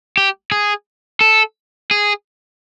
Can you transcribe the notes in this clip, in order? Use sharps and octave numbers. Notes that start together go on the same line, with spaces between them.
G4
G#4
A4
G#4